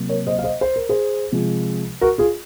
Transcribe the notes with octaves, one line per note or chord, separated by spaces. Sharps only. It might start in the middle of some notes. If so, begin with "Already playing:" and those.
Already playing: C3 F#3 A#3
A#4 C#5
C5 D#5
F5
C5 D#5
C5
A#4
G#4 C5
C3 F3 G#3
F#4 A#4
F4 G#4